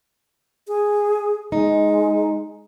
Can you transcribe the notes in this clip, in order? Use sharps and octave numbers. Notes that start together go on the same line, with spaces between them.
G#4
G#3 D#4